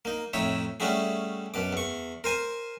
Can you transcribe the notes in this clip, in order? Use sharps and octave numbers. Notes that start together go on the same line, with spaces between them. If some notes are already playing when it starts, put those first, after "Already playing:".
A#3 D#4
F2 A2 D#4 C#5 E5
G3 A3 C#4 E4 F#4 G#4
F#2 B2 D6
E2 C#6
A#4 C5 G#5